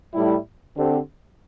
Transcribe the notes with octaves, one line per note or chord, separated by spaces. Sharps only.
A2 G3 E4
D3 C4 G4